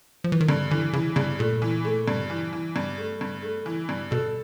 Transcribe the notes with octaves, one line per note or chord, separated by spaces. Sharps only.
F3
E3
D#3
G2 D3
D3 E3
C#3 E3
G2 C#3
A#2 A3
E3
A3
G2
E3
E3
G2
A3
G2
A3
E3
G2
B2 A4